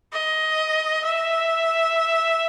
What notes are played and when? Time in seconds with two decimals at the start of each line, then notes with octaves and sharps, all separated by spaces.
0.13 D#5
1.05 E5